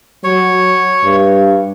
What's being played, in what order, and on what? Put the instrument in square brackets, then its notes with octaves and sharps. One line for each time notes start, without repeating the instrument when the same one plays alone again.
[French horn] F#3 [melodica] C#5
[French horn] G2